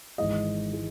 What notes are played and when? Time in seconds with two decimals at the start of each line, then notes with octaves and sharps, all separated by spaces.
0.18 G#1 G#2 E3 G#3 D#5
0.73 E3 G#3